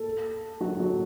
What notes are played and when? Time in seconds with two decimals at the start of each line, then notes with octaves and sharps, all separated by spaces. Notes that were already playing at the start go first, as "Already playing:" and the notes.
Already playing: A4
0.60 F#3 F#4
0.79 F#3 F#4